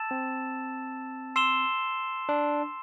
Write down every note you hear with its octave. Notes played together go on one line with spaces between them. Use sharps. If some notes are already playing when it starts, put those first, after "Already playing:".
Already playing: A5 E6 A6 E7
C4
C6 E6 C7 E7 G7
D4